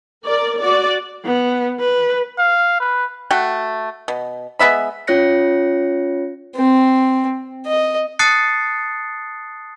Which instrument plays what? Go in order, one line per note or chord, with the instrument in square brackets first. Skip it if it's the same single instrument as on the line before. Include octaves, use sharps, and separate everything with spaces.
[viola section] A#4 D5
F#4 D5
[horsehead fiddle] B3
B4
[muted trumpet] F5
B4
[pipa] A3 F#4 F#5 G5
B2
G#3 B3 E5 B5
[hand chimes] C#4 F4 C#5 F#6 A#6 C#7
[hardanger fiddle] C4
D#5
[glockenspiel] A5 D#6 F#6 A6 C7 C#7